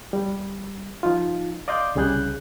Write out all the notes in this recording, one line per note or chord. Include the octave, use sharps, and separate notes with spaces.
G3
F3 D#4 F4
D5 D#5 F5 C6 D6 G6
C2 C#3 G3 G#4 F#6 G6